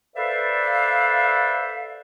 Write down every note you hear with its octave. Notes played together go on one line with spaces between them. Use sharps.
A4 B4 C5 D5 E5 F5